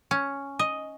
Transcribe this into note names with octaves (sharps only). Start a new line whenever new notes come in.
C#4
D#5